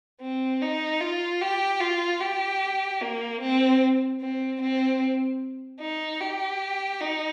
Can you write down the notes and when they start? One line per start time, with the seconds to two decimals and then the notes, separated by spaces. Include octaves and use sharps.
0.21 C4
0.61 D#4
1.00 F4
1.41 G4
1.80 F4
2.20 G4
3.01 A#3
3.41 C4
4.20 C4
4.61 C4
5.80 D#4
6.20 G4
7.01 D#4